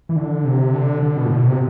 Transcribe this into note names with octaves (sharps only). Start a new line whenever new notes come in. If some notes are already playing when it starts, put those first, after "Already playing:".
E3
D3
C3
D3
D3
B2
A2
B2
C3